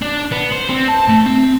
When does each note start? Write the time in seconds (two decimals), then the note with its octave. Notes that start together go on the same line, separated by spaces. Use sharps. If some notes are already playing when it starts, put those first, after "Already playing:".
0.02 D4
0.32 B3
0.52 C5
0.70 C4
0.89 A5
1.09 A3
1.26 C4